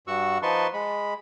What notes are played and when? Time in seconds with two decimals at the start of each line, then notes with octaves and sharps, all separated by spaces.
0.07 G2 F#4 F#5 C#6 E6
0.42 F3 D#4 B4 A5 C6 C#6
0.74 G#3 B5